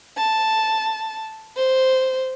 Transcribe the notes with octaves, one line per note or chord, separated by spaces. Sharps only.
A5
C5